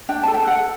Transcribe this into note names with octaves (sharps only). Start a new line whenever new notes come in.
D4 G5
A4 A5
G5
A4 F#5